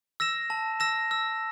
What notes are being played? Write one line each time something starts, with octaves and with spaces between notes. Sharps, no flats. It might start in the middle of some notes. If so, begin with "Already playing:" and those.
E6 A#6 E7
A5
E6 A#6 E7
E6